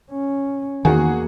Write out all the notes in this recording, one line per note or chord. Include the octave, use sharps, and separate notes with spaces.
C#4
E2 D#3 A#3 F#4 G#4